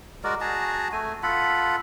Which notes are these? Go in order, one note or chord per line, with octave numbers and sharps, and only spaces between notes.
G#3 F#4 A#4 D5
F#4 G#4 A5 A#5
A3 G#5
F4 A4 F#5 B5